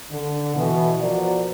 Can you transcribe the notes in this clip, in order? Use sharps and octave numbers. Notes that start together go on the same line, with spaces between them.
D3
B2 E3
F3 B3 F#4 A#4 D5